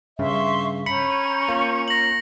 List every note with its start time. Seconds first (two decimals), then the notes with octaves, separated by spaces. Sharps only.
0.19 G2 C#3 E5 C6 C#6
0.86 C#4 A#5 B5 G6 C#7
1.49 A#3 F4
1.88 A#6 F#7